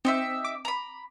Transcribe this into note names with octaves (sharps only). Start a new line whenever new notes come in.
C4 D#4 G4 E5
D6
A#5 B5